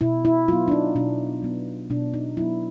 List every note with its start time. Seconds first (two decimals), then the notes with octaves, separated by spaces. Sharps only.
0.01 B2 E4
0.25 E4
0.48 F#3 B3 F4
0.68 D4
0.72 D#4
0.95 B2 D4
1.42 F#3 B3
1.90 B2 D4
2.14 D#4
2.37 F#3 B3 E4